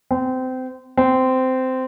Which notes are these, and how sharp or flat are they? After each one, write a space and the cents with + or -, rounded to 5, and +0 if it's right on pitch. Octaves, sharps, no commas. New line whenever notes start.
C4 -25
C4 -15